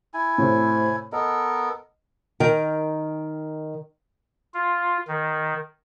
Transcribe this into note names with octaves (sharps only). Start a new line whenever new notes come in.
E4 G#5
A2 C3
B3 A4 A#4 D#5
D#3 A#4 G5
F4
D#3